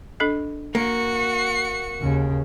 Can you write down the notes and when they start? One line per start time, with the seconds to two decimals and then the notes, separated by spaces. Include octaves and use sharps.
0.20 D4 A4 D#5
0.75 A#3 F#4 C#7
2.01 D#2 C#3